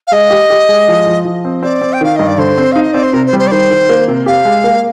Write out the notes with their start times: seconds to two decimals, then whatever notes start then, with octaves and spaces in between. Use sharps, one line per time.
0.07 F5
0.12 G#3 D#5
0.30 G4
0.50 G4
0.69 G#3
0.88 F3
1.07 F3
1.25 F3
1.45 C4
1.63 C4 D5
1.81 C4
1.93 G5
2.01 D#3 F5
2.16 G2 D#5
2.27 D5
2.38 D3 C5
2.58 C4
2.72 D#4 F5
2.83 D#5
2.93 C4 D5
3.03 C5
3.13 C3 A#4
3.26 C5
3.33 G3
3.39 C5
3.47 D5
3.51 D#3 C5
3.70 D#3
3.89 A#3
4.08 C3
4.26 G4 F5
4.45 G#3
4.64 A#3